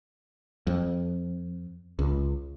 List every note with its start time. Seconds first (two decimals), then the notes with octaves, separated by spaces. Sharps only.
0.67 F2
1.99 C#2